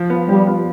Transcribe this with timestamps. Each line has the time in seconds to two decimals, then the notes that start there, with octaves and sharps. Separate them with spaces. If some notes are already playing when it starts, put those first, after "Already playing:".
Already playing: F3
0.10 B3 F4
0.29 F3 G3
0.47 B3 F4